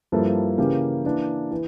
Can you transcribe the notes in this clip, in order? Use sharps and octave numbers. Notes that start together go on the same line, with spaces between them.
G2 F3 A#3 E4 A4
C#3 E3 A#3 C#4 G4
E3 A#3 D4
E3